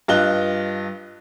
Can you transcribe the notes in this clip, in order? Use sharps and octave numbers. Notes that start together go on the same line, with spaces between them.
G2 F4 D#5 F#6 G7